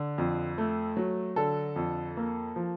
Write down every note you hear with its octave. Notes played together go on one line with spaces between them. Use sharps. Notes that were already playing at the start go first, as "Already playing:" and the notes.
Already playing: D3
F2
A3
F#3
D3 A4
F2
A#3
F3